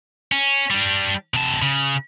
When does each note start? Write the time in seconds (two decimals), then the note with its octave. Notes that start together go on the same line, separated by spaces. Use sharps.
0.32 C#4
0.70 G3 D4
1.34 C3 A5
1.62 C#3